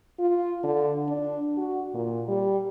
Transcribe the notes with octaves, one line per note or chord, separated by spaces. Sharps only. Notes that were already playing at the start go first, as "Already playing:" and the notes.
F4
D3
D4
F#4
A#2
G3